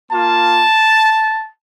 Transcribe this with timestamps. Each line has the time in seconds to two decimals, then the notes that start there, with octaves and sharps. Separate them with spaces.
0.10 A#3 F4 A5